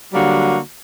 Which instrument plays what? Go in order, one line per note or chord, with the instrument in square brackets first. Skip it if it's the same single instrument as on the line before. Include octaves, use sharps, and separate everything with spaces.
[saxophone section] D3 F#3 G3 A#3 D4 F#4